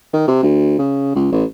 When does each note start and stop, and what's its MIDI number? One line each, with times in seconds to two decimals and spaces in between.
0.13 0.26 51
0.28 0.39 48
0.43 0.76 38
0.78 1.11 49
1.15 1.31 37
1.32 1.44 33